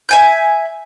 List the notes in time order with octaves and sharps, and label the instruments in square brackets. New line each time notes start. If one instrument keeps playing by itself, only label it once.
[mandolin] E5 G#5 G6